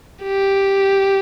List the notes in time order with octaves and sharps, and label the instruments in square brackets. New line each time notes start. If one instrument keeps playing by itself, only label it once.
[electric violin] G4